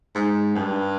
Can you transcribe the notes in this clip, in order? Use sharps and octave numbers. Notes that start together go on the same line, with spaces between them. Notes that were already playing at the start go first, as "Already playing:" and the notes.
G#2
G2